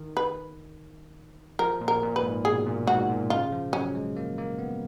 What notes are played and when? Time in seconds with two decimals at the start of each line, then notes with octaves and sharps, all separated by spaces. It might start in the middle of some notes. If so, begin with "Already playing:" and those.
Already playing: D#3
0.17 B4
1.59 F3 A#4
1.81 A#2
1.88 A#4
2.02 A#2
2.16 B4
2.23 G#2
2.45 B2 G#4
2.66 A#2
2.87 G#2 F#4
3.09 A#2
3.30 C#3 F4
3.52 F3
3.73 F#3 C#4
3.95 G#3
4.16 A#3
4.38 A#3
4.59 B3